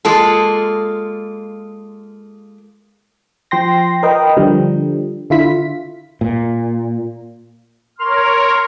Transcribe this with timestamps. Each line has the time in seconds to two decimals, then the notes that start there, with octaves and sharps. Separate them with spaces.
0.05 G#3 A#3 F4 A4
3.51 F3 G5 C6 A#6
4.03 A#4 B4 D#5 G5
4.37 D3 F3 G3
5.30 D3 E4 F4 B6
6.21 A#2
7.99 A#4 C#5 C6 F6